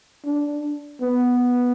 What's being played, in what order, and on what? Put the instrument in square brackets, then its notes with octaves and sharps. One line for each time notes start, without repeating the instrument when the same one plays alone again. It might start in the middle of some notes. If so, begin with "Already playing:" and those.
[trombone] D4
B3